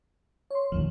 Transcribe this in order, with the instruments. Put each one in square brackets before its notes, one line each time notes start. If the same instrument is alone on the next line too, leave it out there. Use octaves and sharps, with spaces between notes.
[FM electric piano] C#5 C6
[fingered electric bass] E1 A#1 D#2 [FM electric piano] F3